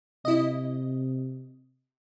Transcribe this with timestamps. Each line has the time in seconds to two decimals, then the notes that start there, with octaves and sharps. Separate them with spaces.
0.25 C3 E4 D#5